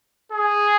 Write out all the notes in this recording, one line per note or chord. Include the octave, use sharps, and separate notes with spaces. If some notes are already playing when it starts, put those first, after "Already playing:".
G#4